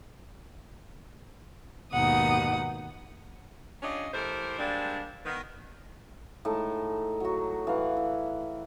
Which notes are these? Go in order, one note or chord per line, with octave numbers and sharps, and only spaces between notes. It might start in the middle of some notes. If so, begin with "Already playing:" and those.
D#2 G#2 B2 D#4 F#5 D#6
C#4 D4 F4 G4 C#5 D#5
E3 A3 G4 A#4 C5
G3 G#3 A#3 C4 D4
D#3 B3
A2 G#3 D#4 A5
F#3 F#4
E3 F5 F#5
E4